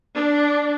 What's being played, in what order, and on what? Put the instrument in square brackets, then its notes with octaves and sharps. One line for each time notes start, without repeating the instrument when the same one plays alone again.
[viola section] D4